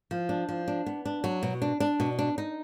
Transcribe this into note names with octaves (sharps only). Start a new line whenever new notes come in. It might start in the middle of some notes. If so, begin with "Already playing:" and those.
F3
D4
F3
D4
B3
D4
F#3
B2
D4
D4
B2
D4
D#4